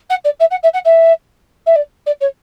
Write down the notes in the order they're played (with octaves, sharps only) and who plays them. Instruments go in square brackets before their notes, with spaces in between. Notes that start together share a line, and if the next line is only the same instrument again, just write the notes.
[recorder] F#5
D5
E5
F#5
E5
F#5
E5
E5
D5
D5
C#5